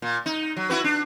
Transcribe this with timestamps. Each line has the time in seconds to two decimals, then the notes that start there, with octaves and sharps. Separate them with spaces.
0.02 A#2
0.26 D#4
0.57 F#3
0.70 E4 F#4 B4
0.84 D4